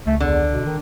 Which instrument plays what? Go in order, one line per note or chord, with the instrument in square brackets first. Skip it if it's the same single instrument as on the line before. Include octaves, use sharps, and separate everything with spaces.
[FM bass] C#2 [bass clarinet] A3
[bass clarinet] E2 [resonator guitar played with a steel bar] D3
[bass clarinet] B2
D#3